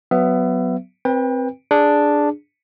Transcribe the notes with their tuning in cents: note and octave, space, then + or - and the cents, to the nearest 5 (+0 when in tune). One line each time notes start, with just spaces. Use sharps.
F#3 +0 B3 +15 E5 +25
C4 +0 B4 -25 G5 +30
D4 +0 G#4 +0